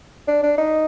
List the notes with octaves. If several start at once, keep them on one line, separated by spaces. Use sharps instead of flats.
D4
D4
D#4